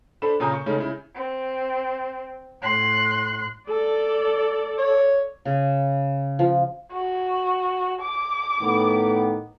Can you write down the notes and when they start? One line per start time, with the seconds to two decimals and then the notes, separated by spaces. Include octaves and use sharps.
0.22 D4 A4 C5 B5 E7
0.40 A#2 C#3 G#5 A#5 D#6 G6
0.53 C#6
0.66 C#3 G#3 A3 C#4 D#4
0.78 C#3 E4
1.15 C4
2.62 A2 C6 F#6
3.69 A4 D5
4.78 C#5
5.45 C#3
6.39 F3
6.92 F#4
8.02 D6
8.60 A2 D#3 B3